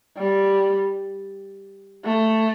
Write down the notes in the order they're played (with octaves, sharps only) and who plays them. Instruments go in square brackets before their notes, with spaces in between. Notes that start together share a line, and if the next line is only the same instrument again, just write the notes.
[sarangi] G3
A3